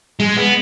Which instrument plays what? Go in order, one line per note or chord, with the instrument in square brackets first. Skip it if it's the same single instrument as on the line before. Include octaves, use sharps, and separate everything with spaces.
[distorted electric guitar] G#3
B3